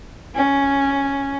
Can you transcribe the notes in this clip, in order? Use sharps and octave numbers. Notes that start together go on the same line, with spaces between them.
C#4